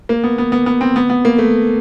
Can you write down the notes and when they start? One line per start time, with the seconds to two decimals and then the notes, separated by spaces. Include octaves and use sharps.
0.09 A#3
0.24 B3
0.38 B3
0.52 B3
0.66 B3
0.81 C4
0.96 B3
1.10 B3
1.25 A#3
1.39 A3